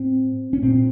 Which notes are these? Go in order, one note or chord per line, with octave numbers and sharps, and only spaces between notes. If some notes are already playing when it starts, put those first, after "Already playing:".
Already playing: A2 C4
C#4
A#2 C4